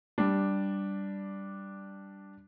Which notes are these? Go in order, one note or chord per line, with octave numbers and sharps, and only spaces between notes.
G3 D4